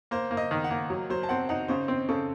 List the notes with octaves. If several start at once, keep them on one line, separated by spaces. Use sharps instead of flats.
A#3 C5
A#3
D#5
D#3
F#5
A#3
F#3
F#3 C5
A5
C4 F#5
D#4 F#5
C#3 C5
C4
C#3 A4